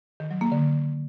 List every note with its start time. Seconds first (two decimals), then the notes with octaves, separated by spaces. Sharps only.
0.20 D#3
0.31 F#3
0.41 A#3
0.52 D3